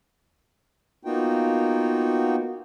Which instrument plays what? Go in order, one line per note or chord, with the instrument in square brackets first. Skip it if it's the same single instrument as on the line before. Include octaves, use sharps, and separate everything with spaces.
[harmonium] A#3 B3 D#4 F4 F#4 G5